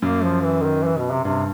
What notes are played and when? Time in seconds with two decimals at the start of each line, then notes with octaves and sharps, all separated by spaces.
0.02 F#2 A#3
0.23 F3
0.43 E3
0.63 D#3
0.84 E3
0.98 B2
1.11 C3
1.24 G2 C3